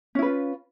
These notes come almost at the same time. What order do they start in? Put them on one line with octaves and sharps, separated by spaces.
C#4 E4 B4 F4